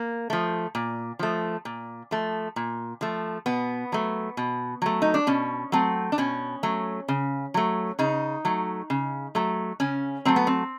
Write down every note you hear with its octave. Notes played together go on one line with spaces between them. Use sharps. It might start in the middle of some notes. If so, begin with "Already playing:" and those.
Already playing: A#3
F3 A3
A#2
F3 A3
A#2
F3 A3
A#2
F3 A3
B2 B3
F#3 A3
B2
F#3 A3
D#4
D4
B2 C#4
F#3 A3 C4
D4
B2 C#4
F#3 A3
C#3
F#3 A3
C#3 D#4
F#3 A3
C#3
F#3 A3
C#3 C#4
F#3 A3 C4
B3
C4